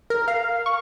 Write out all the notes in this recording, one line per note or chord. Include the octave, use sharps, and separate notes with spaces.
A#4
F5
C#6